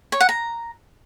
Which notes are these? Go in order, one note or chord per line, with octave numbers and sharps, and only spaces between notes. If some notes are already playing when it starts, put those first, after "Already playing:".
C#5
F#5
A#5